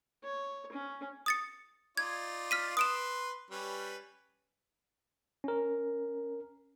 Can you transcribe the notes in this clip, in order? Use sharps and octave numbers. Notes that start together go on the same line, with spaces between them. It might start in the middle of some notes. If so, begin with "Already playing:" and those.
C#5
C#4
D#6 A6 C#7
D#4 F4 D5 G#6
F6 B6 D#7
B4 C6 D#6 D7 E7
G3 C#4 B4
C#4 A#4